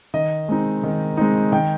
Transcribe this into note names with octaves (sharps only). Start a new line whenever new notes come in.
D#3 D#5
G#3 C4 D#4
D#3
G#3 C4 D#4
D#3 G5